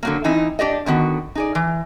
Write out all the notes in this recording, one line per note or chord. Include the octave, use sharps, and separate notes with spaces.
D3 F#3 A#3
E3 C4 D#4 E4
D4 G4 D5 D#5
D3 D#3 B3 F#4
D#4 G#4 D5
E3